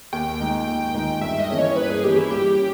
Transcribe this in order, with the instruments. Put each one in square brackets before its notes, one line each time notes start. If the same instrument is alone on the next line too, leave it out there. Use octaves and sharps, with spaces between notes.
[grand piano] D#2 [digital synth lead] G5
[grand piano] D#3 G#3 D#4
[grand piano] D#2 [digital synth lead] G5
[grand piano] D#3 G#3 D#4
[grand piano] G2 [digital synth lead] E5
[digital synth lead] D#5
[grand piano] E3 A#3 C#4 G#4
[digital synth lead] C#5
[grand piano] G2 [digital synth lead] B4
[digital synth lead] G#4
[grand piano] E3 A#3 C#4 G#4 [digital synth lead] G4
[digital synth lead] E4
[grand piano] G3 [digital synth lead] G4
[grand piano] C#4